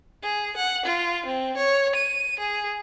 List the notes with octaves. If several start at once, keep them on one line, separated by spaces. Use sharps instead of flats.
G#4
F#5
F4
C4
C#5
D#7
G#4